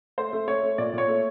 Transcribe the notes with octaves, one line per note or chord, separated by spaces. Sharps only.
A3 C5
A3
A3 C#5
A3
A#2 D5
A#2 C#5
A3